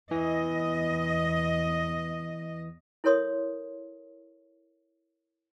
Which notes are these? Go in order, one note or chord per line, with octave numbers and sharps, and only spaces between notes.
E2 E3 D#5
E4 A4 A#4 C#5 C6 D#6